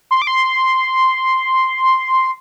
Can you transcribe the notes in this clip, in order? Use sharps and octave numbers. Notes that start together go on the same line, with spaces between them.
C6
D6
C6